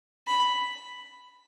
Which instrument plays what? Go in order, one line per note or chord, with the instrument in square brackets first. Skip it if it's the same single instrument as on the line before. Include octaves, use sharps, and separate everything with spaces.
[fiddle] B5